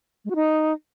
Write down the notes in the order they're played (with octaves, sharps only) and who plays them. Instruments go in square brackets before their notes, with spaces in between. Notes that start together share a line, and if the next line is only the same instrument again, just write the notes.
[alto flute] G#3
F#4
D#4